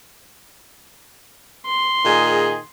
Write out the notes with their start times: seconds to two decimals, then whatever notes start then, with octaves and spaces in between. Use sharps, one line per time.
1.66 C6
2.05 A#2 D#3 G#4